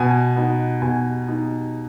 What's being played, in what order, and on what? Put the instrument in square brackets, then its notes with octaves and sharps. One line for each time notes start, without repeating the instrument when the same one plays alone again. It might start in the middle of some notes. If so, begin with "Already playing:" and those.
Already playing: [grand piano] B2 G#5
B3 D#4
B2 G#5
B3 D#4